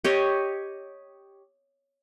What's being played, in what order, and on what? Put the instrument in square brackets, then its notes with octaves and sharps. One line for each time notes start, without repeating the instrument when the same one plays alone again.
[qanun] G4 C#5 D#5